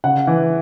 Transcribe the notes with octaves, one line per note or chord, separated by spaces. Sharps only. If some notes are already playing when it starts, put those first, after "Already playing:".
C#3 F#5
E3